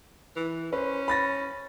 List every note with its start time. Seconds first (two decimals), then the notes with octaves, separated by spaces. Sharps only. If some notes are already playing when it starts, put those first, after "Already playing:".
0.36 E3
0.73 C#4 B4 C5
1.08 B5 A6 A#6